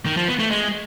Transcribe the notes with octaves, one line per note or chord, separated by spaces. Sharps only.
D#3
F3
B3
A3
G#3